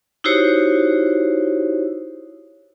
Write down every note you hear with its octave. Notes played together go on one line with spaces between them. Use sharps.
D#4 E4 F#4 G4 C5 C#5